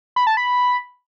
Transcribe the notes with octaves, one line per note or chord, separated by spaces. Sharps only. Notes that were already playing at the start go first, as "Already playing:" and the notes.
B5
A5
B5